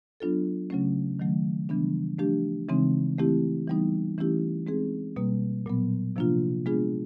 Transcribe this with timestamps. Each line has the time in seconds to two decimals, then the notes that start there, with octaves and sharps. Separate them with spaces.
0.20 F#3 B3 D4 F4 A4
0.70 C#3 F#3 A3 C#4
1.20 D#3 F#3 A3
1.69 C#3 E3 G3 B3 D4
2.18 F3 A3 D4 G4
2.69 C#3 E3 G#3 C4 D#4
3.18 E3 A3 C4 E4 G4
3.68 E3 G3 B3 D#4
4.18 E3 A3 C#4 E4 G4
4.67 G#3 C4 D#4 G#4
5.16 B2 G3 A#3
5.66 A#2 F#3 B3
6.16 C3 F3 A#3 D4 F4
6.66 G#3 B3 D4 F4 G#4